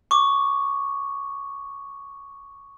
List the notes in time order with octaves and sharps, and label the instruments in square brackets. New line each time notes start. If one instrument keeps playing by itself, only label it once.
[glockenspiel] C#6 D6